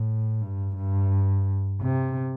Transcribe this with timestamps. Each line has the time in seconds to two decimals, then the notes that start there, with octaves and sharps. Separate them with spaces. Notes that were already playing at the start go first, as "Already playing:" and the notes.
Already playing: A2
0.42 G2
0.76 G2
1.81 C3